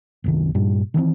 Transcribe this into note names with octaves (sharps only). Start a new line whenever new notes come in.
F#1 C2 D#3
G2 A#2 G3
D#3 E3 G#3 C4